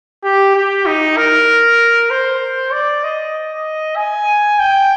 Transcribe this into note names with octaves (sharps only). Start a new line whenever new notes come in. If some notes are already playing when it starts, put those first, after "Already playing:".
G4
G4
D#4
A#4
C5
D5
D#5
G#5
G5